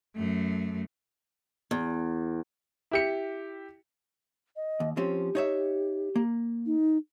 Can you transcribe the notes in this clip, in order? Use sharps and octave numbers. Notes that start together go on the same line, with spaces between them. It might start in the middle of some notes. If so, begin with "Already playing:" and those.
F#2 A3
E2
E4 G4 C#7
D#5
D#2
F3 C4 C#4 G4
D#4 C#5 E5
A#3
D#4